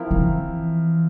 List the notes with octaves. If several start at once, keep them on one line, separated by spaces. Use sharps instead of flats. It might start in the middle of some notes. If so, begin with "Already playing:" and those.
Already playing: F3 C4 E4 A#4
E3